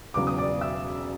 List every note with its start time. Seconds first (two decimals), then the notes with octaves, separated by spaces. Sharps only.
0.14 E1 E2 C#3 F#3 D6
0.27 D#6
0.38 D5 D6
0.61 E5 E6